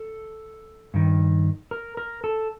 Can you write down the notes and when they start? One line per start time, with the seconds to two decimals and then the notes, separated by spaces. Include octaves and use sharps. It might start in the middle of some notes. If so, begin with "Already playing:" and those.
Already playing: A4
0.94 G2 D#3
1.71 A#4
1.97 A#4
2.24 A4